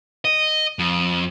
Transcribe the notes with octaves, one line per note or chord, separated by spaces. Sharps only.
D#5
F2